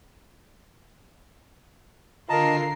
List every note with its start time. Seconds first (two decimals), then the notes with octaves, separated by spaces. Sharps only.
2.29 D3 F4 A#4 D#5 A5 A#5 C7